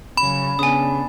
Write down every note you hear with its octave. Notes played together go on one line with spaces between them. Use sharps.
C#3 F#3 B5
C#3 B3 D4 G#5 D#6